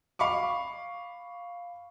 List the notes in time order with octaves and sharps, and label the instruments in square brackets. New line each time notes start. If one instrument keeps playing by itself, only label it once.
[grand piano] F5 B5 C#6 D6